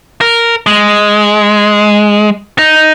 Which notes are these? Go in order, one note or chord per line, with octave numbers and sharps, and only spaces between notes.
A#4
G#3
D#4